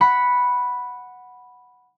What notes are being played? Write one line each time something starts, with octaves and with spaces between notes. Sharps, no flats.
F#5 B5